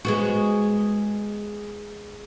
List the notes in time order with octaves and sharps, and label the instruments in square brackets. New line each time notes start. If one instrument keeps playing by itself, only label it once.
[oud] G#3 B3 F#4